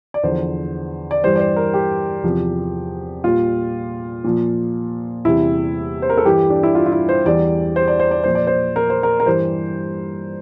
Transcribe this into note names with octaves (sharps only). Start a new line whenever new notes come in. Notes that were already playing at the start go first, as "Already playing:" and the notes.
D5
E2 D3 F3 C5
D5
G2 E3 G3 C5
D5
C5
A#4
G4
E2 C3 F3
A#2 G3 F4
A#2 F3
E2 C3 G3 E4
C5
A#4
A4
G2 E3 G3 G4
D4
E4
F4
F4
E4
C5
E2 E3 G3 D5
C5
D5
C5
D5
A#2 F3 C5
D5
C5
A#4
C5
A#4
A#4
G2 E3 G3 C5